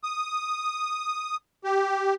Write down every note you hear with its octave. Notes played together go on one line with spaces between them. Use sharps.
D#6
G4